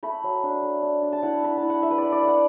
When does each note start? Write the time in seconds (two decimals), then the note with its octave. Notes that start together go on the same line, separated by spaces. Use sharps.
0.03 A3 B5
0.24 F#3
0.43 D4
0.62 A3
0.82 D4
1.02 D4
1.12 A5
1.22 E4 F#5
1.42 E4 B5
1.57 A5
1.62 E4
1.70 F#5
1.82 A3 E5
1.91 B4
1.98 A3 D5
2.12 D5
2.22 A3 F#5